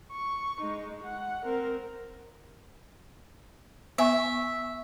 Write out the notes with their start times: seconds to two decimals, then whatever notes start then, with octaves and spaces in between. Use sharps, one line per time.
0.11 C#6
0.61 G#3 D#4
1.03 F#5
1.45 C4 A#4
3.98 B3 E5 G#5 C#6